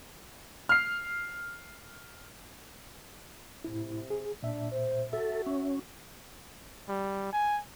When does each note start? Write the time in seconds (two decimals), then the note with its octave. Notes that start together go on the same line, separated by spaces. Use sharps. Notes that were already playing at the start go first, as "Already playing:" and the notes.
0.69 F6 C7
3.64 A2 C3 E4
4.10 G#4
4.43 A#2 D4 E5
4.71 C5
5.13 F#4 A4 E5
5.46 C#4
6.89 G3
7.33 G#5